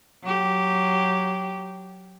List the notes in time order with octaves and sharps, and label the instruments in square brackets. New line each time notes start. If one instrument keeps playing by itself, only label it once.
[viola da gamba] F#3 G4